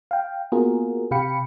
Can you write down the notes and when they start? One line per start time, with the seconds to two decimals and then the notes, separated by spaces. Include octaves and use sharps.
0.11 F5 G5
0.52 A#3 B3 F4 F#4 G#4 A#4
1.11 C3 G4 F5 G5 B5 C#7